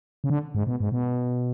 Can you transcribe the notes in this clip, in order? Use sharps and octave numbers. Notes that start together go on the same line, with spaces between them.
C#3
D3
G#2
B2
G#2
B2